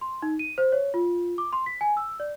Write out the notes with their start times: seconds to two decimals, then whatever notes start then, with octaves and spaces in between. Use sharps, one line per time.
0.01 C6
0.22 D#4
0.39 D#7
0.58 C5
0.72 C#5
0.94 F4
1.38 D6
1.53 C6
1.66 B6
1.81 G#5
1.97 E6
2.20 D5